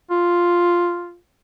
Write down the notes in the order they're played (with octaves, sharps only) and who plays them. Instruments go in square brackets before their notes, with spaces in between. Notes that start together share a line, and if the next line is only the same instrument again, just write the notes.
[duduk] F4